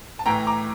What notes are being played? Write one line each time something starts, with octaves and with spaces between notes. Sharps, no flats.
A5
A2 E3 G5 A#5
A#5 D6